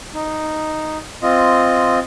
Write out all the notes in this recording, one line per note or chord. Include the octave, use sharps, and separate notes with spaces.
D#4
C4 F4 D#5